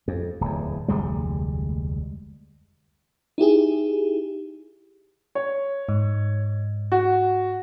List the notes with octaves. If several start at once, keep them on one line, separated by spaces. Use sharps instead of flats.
F2
D1 E2
F1 D2 G3 G#3
D#4 E4 G4 G#4
C#5
G#2
F#4